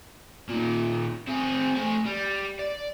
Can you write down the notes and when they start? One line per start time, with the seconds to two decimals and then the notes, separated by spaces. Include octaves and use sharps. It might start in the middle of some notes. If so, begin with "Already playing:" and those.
0.49 A#2 D#3
1.28 C4 G#4
1.76 A3 G#5
2.06 G3
2.59 D5